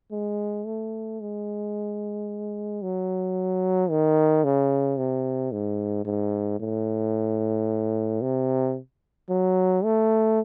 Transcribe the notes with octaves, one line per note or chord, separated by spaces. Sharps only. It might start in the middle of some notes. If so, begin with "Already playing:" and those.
G#3
A3
G#3
F#3
D#3
C#3
C3
G#2
G#2
A2
C3
F#3
A3